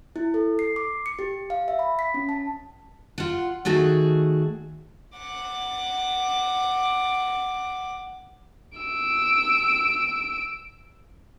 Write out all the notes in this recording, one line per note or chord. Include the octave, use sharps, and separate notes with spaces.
E4
A4
C7
D6
C#7
G4
F5
E5
B5
B6
C#4
A5
F4 F#5
D#3 A3 F#4 G#4
F#5 D6
E6 D7